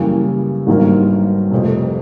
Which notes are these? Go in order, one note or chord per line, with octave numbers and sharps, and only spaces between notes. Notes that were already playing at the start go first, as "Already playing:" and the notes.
Already playing: F#2 C#3 E3 G3 A#3
G#1 G2 D#3 F#3 A#3
F1 F2 C3